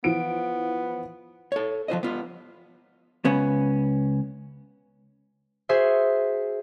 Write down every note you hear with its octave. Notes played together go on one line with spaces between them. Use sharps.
E3 F3 B3 D7
A4 C#5
F3 F4 C5 D#5
B3 F4
C#2 B3 C#4
F#4 G#4 C5 E5